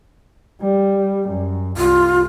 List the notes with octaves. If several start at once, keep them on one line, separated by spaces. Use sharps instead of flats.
G3
F#2
C2 F4